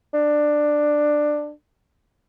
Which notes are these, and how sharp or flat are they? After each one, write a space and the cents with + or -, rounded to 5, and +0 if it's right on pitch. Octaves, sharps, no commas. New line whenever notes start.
D4 +15